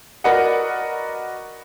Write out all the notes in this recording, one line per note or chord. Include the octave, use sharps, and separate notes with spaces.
F#4 A#4 B4 D5 D#5 F#5